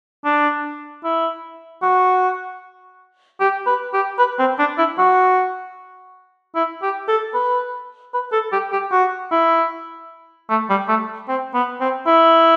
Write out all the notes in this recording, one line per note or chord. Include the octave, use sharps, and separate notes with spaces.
D4
E4
F#4
G4
B4
G4
B4
C4
D4
E4
F#4
E4
G4
A4
B4
B4
A4
G4
G4
F#4
E4
A3
G3
A3
C4
B3
C4
E4